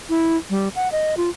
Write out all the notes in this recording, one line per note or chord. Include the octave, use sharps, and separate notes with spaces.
E4
G3
F#5
D#5
F4